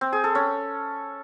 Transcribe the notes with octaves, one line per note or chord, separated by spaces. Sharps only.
C4
G#4
A4
C#4